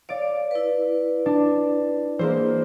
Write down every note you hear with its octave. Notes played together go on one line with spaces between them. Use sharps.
C#5 D5 F5 D7
E4 B4
D4
E3 G#3 A#3 C5